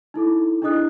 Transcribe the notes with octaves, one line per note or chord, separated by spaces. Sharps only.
D#4 E4 A4 D6
D4 E4 G#4 D#5 D#6 F#6